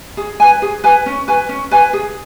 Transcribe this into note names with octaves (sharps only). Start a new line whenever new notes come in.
G#4
B4 G#5
G#4
B4 G#5
C#4
B4 G#5
C#4
B4 G#5
G#4